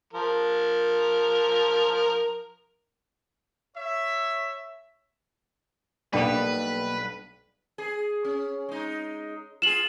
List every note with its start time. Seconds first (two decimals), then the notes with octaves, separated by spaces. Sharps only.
0.13 F3 A#4
3.77 C#5 E5
6.13 B1 G3 A#3 B3 D4 B4
7.78 G#4
8.25 C#4
8.69 G#3 D#4
9.62 F4 G#4 E7 F#7